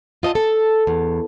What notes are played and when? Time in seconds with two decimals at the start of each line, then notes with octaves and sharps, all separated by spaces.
0.23 F4 D#5 A5
0.35 A4
0.87 E2